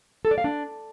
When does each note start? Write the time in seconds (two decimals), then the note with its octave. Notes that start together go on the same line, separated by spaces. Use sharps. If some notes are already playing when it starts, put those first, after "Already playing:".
0.25 A4
0.31 D5
0.38 F5
0.44 D4